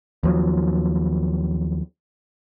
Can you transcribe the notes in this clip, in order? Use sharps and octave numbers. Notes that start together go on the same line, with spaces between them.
D#2 F3 F#3